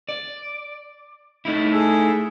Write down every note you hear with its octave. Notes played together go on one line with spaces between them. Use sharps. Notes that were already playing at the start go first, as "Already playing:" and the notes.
D5
A3 D#4 E4
G#4 A4